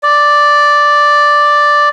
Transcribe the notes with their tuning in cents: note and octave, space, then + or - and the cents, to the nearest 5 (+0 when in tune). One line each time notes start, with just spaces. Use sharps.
D5 +0